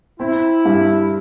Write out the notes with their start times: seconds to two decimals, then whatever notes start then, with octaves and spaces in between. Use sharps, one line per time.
0.20 C4 E4
0.65 G2